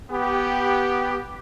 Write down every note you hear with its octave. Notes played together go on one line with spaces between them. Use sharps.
B3 G4